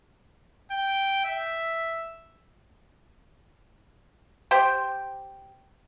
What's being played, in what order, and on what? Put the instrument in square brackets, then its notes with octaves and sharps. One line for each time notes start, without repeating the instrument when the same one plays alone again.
[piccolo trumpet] G5
E5
[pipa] G4 C5 G5